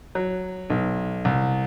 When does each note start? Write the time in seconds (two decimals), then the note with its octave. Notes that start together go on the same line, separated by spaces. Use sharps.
0.15 F#3
0.70 B1
1.25 C2